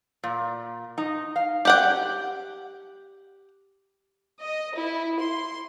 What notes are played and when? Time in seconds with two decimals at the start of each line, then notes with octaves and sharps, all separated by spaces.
0.23 A#2
0.98 D#4
1.36 F5
1.65 G4 F#5 G5
4.40 D#5
4.79 E4
5.20 C6